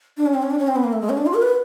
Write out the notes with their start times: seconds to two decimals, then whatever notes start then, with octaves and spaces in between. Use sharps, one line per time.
0.17 D4
0.26 C#4
0.34 C4
0.43 C#4
0.50 D4
0.59 C#4
0.67 C4
0.76 B3
0.84 A#3
0.93 A3
1.01 G#3
1.09 C#4
1.17 D4
1.26 F4
1.34 A#4
1.42 B4